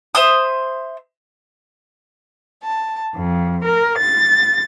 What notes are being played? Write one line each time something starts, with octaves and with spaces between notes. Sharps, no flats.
C5 E5 C6 D#6
A5
F2
A#4
A6